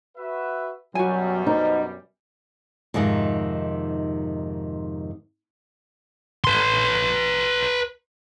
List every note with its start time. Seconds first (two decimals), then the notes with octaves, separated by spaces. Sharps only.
0.18 F#4 B4 E5
0.95 F#2 B2 F#3 G3 F#4 G#5
1.47 D#4 C5
2.94 F2 G#2 C3 D#3
6.44 B4 C6